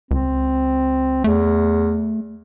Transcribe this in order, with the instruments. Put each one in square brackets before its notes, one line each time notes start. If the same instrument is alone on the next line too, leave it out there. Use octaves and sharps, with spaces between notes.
[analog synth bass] C#2 [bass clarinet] C4
[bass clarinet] E2 [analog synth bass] A3